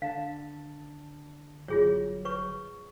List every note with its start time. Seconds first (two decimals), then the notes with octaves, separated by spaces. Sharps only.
0.02 D3 D4 F5 A5
1.68 G1 F#3 F4 G#4 C#5
2.25 B4 C#5 C#6